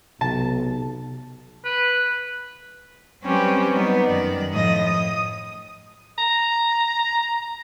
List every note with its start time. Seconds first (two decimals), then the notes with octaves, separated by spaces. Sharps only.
0.21 B1 C3 A5
1.64 B4
3.25 F#3 G3 C4 C#4 G4 B4
3.74 F#3 G3 B3 D#4
4.06 F#2 D#3 D5
4.52 A2 F3 D#5 D#6 A#6
4.83 D#6
6.18 A#5